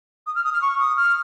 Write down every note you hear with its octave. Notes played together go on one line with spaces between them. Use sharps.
D#6
F6
D#6
F6
C#6
D#6
F6